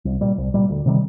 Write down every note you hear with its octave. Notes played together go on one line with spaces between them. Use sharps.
C2
A#2 G3
C2
A#2 G3
D2
C3 D#3 G3